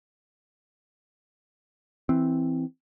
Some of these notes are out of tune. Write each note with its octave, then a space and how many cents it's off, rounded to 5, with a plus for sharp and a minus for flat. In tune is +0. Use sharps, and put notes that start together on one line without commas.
E3 +0 C4 +0